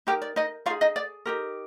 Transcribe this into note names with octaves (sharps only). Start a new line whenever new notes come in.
D#4 G4 A#4 G5
D5
D#4 D#5
D#4 F4 G#4 F5
D#4 D#5
D5
D#4 G4 A#4